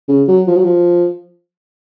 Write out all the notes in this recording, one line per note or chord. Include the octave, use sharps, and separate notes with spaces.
C#3
F#3
F3
F#3
F3